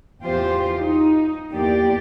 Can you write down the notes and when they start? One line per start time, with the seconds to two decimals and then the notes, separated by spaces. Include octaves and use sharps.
0.25 E2 F4 G4 C5
0.80 D#4
1.53 E2 A#3 G4 D5